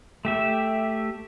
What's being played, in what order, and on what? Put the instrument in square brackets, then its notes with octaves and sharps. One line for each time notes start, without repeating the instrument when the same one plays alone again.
[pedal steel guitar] A3 G4 E5